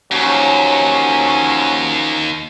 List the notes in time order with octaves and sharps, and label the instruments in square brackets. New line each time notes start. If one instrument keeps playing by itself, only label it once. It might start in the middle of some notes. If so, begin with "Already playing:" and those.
[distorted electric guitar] D#2 [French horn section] F3 F#3 C#4